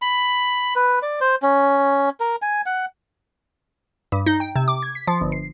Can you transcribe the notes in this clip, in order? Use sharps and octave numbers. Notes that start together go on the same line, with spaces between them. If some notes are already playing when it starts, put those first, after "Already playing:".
B5
B4
D5
C5
C#4
A#4
G#5
F#5
G2
D#4
G5
C3
D6
G#6
B6
F3
G1
C7